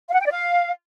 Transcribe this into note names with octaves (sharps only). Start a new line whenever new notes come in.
F5
F#5
G5
D5
F5